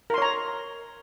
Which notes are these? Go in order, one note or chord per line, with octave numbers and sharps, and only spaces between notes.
A#4 C#5 A#5 C6